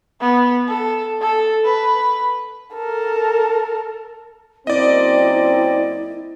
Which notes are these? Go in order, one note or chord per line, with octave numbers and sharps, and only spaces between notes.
B3
A4
A4
B4
A4 A#4
F#2 A#3 C4 E4 D5 D#5